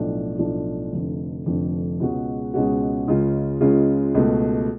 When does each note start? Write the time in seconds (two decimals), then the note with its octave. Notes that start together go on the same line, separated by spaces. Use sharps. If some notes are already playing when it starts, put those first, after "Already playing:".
Already playing: B1 A2 F3 A3 D4
0.39 B1 A2 F3 A3 D4
0.92 F1 F2 D3
1.46 F1 F2 D3
2.00 C#2 B2 G#3 C#4 F#4
2.54 C#2 B2 G#3 C#4 F#4
3.07 C#2 C#3 G#3 C#4 F4
3.61 C#2 C#3 G#3 C#4 F4
4.14 C#2 B2 A3